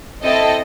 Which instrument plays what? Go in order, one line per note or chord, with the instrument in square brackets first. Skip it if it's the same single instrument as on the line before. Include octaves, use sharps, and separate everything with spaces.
[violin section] C4 E4 A4 D#5